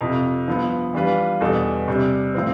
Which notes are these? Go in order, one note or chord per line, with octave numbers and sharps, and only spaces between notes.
F2 C3 F3
G2 F3 B3
E3 G3 D4 F4 B4
E2 B2 G3 D4 A4
C3 G3 D4
A2 F3 C4